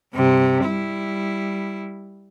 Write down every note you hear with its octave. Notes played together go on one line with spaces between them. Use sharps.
G2 C3
G3 E4